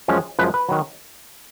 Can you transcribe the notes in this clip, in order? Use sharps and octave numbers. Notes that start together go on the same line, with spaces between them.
F#2 F3 G#3 C#4
F#2 F3 G#3 B4
B4
D#3 F#3